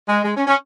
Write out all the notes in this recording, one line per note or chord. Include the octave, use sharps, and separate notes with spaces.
G#3
G#3
C#4
C#4